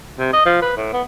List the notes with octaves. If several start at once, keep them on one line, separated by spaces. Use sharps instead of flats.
C3
D#5
F3
B4
A2
B3